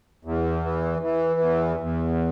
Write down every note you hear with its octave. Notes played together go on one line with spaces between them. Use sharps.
E2
E3
E3
E2
E2